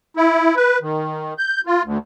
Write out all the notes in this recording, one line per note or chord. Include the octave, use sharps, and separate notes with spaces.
E4
B4
D#3
G6
F4
D2